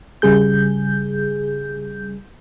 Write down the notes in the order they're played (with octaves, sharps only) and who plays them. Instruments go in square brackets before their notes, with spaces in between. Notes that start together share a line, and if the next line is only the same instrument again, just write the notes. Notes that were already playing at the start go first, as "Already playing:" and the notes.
[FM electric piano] G1 C#3 G3 G#4 G6